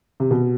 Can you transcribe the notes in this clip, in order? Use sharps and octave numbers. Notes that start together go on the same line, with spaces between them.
C3
B2